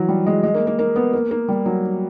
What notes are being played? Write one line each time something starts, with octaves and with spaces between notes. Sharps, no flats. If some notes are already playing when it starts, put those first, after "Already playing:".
Already playing: E3 F#3
G3
G#3
G#3
A#3
A#3
A#3
B3
A#3
A#3
G3
F#3